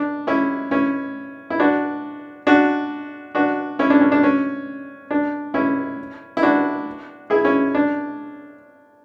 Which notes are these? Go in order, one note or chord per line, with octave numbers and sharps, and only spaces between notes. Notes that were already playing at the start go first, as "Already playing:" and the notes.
Already playing: D4
C#4 E4
C#4 E4
E4
D4 F#4
D4 F#4
D4 F#4
C#4 E4
D4
C#4
D4
C#4
D4
C#4 E4
E4
D4 F#4
E4 G#4
C#4 E4
D4